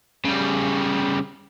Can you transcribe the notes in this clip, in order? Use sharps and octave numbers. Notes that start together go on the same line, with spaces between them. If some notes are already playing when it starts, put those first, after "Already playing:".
C#3 G3